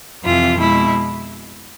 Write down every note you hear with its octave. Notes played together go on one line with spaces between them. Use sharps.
F2 C3 E3 F4
B2 G#3 E4